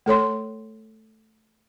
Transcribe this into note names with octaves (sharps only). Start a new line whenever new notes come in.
A3 A4 C#5 C6